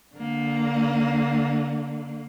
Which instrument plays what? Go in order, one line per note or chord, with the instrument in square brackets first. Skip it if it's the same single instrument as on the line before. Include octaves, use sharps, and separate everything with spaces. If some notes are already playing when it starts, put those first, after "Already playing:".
[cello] D3 A#3